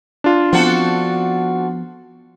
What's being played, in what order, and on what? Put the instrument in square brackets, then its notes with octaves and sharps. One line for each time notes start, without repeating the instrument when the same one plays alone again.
[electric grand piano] D4 F4
[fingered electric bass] F3 B3 [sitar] C4 F#4 A4